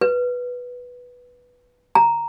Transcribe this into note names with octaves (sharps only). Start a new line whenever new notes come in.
B4
A#5